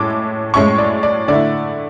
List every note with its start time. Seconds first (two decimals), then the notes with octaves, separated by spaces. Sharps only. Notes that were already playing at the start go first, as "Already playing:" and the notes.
Already playing: A2 G#3 C#4 E4 D6
0.53 A2 G#3 C#4 E4 C#6
0.78 D5
1.03 D5
1.28 D3 A3 E4 D5